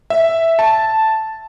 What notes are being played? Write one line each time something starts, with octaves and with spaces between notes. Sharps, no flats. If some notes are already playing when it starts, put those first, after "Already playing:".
E5
A5